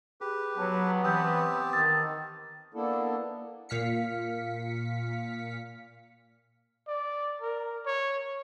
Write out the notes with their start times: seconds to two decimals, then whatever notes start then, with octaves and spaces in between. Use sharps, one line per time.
0.21 G4 G#4 B4
0.58 F#3 B3 A5 A#5
1.04 E3 C4 G4 A5 D#6 E6 G6
1.73 D#3 D#6 E6 A6
2.74 A#3 B3 D4 E4 A4
3.69 A#2 F5 B6 C#7
6.87 D5
7.42 A#4
7.86 C#5